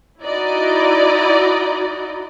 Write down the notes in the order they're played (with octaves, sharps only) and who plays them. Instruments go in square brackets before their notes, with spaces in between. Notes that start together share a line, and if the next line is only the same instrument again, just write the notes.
[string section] D#4 E4 F#4 D5 D#5